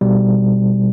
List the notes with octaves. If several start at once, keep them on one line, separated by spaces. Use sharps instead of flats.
B2 G3